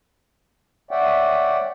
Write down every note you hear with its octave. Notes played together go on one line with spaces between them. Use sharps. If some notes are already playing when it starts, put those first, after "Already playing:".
C#5 D5 E5 F#5 G5